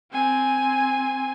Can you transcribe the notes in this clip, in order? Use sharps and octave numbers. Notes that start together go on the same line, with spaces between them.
C4 G#5